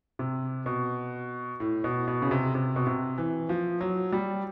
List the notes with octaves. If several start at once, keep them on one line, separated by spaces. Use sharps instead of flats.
C3
B2
A2
B2
B2
C#3
C3
C3
B2
C3
E3
F3
F#3
G3